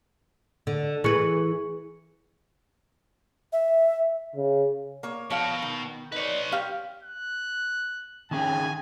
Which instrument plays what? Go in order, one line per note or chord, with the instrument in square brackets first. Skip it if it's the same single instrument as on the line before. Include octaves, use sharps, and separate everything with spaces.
[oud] D3
[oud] E3 B4 [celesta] G#4 C#6 C#7
[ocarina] E5
[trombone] C#3
[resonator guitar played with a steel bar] A#3 C#5
[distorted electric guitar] B2 [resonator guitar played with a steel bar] F3 C#5 F5
[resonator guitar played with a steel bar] D#3
[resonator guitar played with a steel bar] D#4 D5 [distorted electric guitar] B4 C#5
[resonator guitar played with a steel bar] G4 F5
[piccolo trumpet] F#6
[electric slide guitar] D#3 C#4 G#4 [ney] G5 [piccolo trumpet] G#5